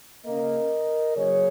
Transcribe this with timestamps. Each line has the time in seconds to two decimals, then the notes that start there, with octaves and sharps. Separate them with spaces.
0.25 C#3 A#3 A#4 D#5
1.16 C#3 F#3 A#3 G#4 C#5